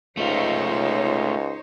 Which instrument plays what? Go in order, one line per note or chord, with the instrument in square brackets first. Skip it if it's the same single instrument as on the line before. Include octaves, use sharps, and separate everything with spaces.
[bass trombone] C#2 [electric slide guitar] A3 F4 [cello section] D#4 C5 C#5